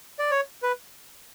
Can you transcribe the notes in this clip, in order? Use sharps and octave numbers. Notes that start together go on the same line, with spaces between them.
D5
C#5
B4